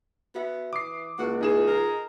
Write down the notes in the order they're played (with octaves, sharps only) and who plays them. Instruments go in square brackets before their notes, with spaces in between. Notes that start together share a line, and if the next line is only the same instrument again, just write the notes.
[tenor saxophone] B3 [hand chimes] F#4 E5
[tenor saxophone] E3 [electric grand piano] D6 C7 [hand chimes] D#6
[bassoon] C#2 [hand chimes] A#3 E4 D6 [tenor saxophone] F#4
[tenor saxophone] E3 [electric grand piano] D#4 G#4 E7 [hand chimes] F4
[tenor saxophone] A#4